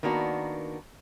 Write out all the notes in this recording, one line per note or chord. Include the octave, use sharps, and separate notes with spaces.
D#3 A#3 B3 D4 F#4